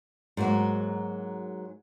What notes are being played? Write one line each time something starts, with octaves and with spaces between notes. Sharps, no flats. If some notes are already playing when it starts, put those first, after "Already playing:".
G#2 F#3 A#3 F#4